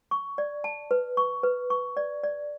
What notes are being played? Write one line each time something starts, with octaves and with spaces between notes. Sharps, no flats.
C#6
D5
A5
B4
C#6
B4
C#6
D5
D5